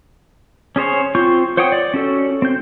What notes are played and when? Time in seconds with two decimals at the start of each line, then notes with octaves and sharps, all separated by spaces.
0.76 C#4 G#4 C5 C#5
1.15 C4 F4 C6 C#6 G6
1.57 C5 C#5 F#5 G5 D#6
1.72 D5
1.94 C#4 F#4 A4
2.42 C4 G6